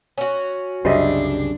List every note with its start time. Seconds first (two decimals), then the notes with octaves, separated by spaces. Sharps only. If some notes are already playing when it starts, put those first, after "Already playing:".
0.18 C#4 F#4
0.85 C2 F#2 C#3 G3 D4 C5 D#5 E5